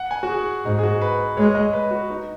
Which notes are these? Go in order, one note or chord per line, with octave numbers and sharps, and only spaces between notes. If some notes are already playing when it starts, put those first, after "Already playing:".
Already playing: F#5
G#5
F#4
G#4
G#2 D#4
G#4
F#4
B4
G#3 C#5
D#5
B4
F#4
D#4